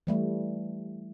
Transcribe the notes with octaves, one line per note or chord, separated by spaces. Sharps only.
E3 G3 A3